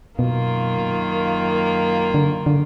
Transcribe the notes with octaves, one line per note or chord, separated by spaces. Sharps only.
F#2 B2 D#3 A#3 F4
D3
D3